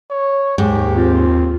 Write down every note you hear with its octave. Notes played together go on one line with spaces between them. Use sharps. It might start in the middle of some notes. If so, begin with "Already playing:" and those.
C#5
D#2 G#2 G4
C4 F4